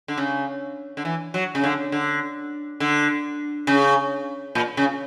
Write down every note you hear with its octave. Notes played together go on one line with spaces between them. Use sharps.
D3
C#3
D3
E3
F#3
C#3
D3
D3
D3
C#3
A#2
C#3